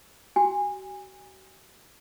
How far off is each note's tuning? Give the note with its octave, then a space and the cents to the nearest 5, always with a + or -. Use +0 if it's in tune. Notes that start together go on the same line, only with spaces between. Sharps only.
F#4 +40 G#5 -25